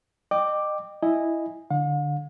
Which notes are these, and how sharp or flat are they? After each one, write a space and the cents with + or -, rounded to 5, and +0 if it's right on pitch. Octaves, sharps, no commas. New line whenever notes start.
D#5 -30 G5 +0 D6 +5
E4 +0 D#5 +0 G#5 -10
D3 +0 F5 +45